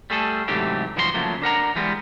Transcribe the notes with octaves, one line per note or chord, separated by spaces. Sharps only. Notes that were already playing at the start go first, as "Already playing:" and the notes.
G3 A3 G#4 A4
G#2 C3 E3 F#3 A3 G4
G2 E3 F3 F#4 G#4 C6
C#3 F3 F#3 A3 A#3
D4 A#4 F#5 A#5
E3 G3 G#3 B3